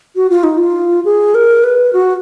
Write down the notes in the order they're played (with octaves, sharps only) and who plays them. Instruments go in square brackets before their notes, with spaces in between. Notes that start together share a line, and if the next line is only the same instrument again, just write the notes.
[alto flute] F#4
F4
D#4
F4
G#4
A#4
B4
F#4